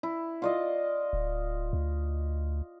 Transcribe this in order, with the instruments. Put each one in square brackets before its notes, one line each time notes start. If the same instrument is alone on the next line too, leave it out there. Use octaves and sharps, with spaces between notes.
[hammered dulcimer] E4
F4 D5 D#5
[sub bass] D1
D2